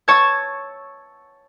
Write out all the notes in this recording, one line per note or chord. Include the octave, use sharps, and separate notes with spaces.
C#5 A5 C#6 E6 G#6